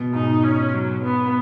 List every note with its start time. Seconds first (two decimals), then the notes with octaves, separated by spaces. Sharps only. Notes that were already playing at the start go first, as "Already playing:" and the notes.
Already playing: B2
0.13 G#2 D#4
0.44 C#4
0.73 F#3
1.04 B3